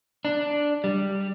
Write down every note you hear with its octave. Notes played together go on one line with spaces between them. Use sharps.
D4
G3